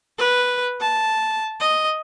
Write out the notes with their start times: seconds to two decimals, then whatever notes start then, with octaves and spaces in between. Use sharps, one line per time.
0.18 B4
0.81 A5
1.60 D#5